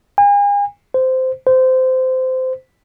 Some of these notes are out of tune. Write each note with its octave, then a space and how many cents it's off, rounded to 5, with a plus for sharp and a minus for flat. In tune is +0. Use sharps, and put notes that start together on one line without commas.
G#5 -40
C5 -15
C5 -20